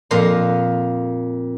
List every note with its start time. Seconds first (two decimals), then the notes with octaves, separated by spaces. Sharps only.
0.11 F2 A#2 A#5 C6